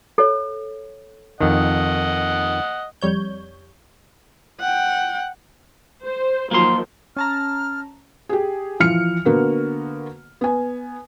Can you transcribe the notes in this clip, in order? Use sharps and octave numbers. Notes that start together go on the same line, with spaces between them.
A4 C#5
F2 D#3 D#5 F#5
F2 G3 C#5 G6
F#5 G5
C5
D#3 F3 F#3 A#3 C6
C#4 A5 A#5 F6
G4 G#4
E3 F3 F6 C#7
D3 A#3 B3 F#4
B3 G#5